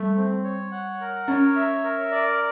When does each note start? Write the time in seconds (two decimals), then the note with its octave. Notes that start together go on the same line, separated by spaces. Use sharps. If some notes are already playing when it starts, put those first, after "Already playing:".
Already playing: G3 A3
0.16 C4
0.44 C#5
0.71 F#5
1.00 A#4
1.28 C#4 C#5
1.56 E5
1.84 A#4
2.12 D5